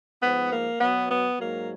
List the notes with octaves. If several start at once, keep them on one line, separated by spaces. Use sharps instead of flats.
G#2 F3 B3
A#3
B2 F#3 B3
B3
G#2 F#3 A#3